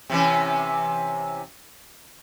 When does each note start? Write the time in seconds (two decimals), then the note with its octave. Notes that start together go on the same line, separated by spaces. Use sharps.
0.10 C3 E3 C#4